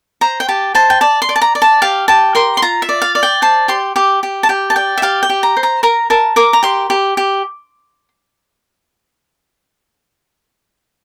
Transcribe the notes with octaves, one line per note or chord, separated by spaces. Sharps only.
C5 A#5
G5
G4 A5
C5 A5
G5
D5 A5
C6
D5
A5
A#5
D5
A5
G4 F5
G4 A5
A#4 C6
C6
F4 A#5
E5
D5
F5
D5
G5
C5 A5
G4 C6
G4 D6
G4
A5
G4 G5
A5
D5 G5
E5
G4 F5
G5
G4
A#5
C5
A#5
A#4 A#5
A#4 A5
A#4 D6
A#5
G4 C6
G4
G4